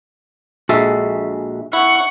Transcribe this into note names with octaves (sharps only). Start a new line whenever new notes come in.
A#1 G#3 F#4 A4 E5
E4 F#5 C#6